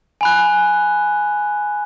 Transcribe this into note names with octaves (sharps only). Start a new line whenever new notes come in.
G#5 B5 F#6